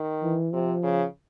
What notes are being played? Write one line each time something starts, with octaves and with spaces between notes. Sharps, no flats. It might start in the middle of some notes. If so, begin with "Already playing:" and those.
Already playing: D#3
E3
C3 F3
C#3